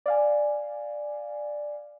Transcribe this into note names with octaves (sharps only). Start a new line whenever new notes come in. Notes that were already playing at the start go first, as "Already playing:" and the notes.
D5 F5 G#5